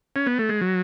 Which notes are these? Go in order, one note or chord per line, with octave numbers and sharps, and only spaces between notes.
C#4
B3
A3
G#3
F#3